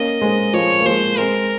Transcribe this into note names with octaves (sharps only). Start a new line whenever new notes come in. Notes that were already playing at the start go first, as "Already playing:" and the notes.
Already playing: A#3 C#4 D#5
G#3 C4
F3 G#3 C#5
A#3
F3 G#3 C5
G#3 C4 A#4